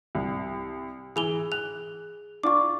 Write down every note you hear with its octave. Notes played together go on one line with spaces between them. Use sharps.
C2
E3 G#4 F7 G7
F#6 F7
D4 F4 C#6 D6